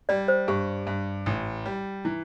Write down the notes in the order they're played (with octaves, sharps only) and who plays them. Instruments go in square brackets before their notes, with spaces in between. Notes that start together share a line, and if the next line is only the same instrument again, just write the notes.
[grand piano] G3 [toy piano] D5
[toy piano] C5
[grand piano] G2 [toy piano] G4
[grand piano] G2
A1
G3
[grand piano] E3 [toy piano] E4